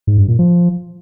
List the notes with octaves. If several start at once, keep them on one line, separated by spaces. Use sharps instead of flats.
G#2
G2
A#2
F3